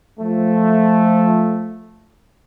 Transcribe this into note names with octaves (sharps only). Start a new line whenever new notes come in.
F3 A3